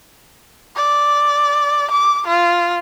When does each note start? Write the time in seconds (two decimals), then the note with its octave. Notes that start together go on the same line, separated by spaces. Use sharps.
0.76 D5
1.91 D6
2.27 F4